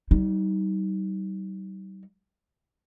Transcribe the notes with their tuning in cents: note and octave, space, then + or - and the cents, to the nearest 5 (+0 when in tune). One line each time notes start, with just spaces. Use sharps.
G3 -35 D#4 +15